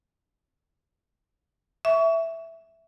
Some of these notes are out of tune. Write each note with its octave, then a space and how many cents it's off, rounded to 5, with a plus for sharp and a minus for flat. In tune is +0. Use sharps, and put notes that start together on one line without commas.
E5 +0 C#6 +30